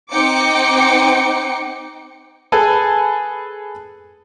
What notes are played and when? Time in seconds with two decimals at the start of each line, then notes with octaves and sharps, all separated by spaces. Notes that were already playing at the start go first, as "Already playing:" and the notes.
0.11 C4 D#4 G5 D6 C#7
2.52 G#4 A4 B4 G#5 A5